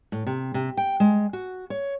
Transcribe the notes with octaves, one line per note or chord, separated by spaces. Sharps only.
A2
C3
C3
G5
G#3
F#4
C#5